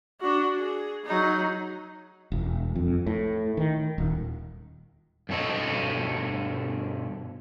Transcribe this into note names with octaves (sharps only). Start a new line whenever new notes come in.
D4 F#4
G#4
F#3 D#4
E1
F2
A2
D#3
D#1
G2 B2 A4 C#5 D#5